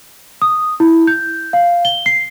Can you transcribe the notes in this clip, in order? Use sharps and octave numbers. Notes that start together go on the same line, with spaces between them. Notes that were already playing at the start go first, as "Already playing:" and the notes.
D#6
E4
G6
F5
G7
C7